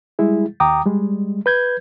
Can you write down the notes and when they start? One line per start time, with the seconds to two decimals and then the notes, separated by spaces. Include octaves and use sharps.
0.19 G3 G#3 E4 G#4
0.60 D#2 G5 A#5 D6 D#6
0.86 G3 G#3
1.46 B4 G6 G#6